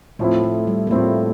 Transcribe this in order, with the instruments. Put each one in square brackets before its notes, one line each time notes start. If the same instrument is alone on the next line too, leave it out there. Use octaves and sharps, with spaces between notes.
[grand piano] A2 F3 C4 E4 [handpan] A3
[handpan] A3
G3
A#3
[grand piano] A2 F3 C4 E4 [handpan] A3